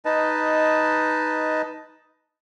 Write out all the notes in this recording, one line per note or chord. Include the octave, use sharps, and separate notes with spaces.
D#4 B4 D#5 A5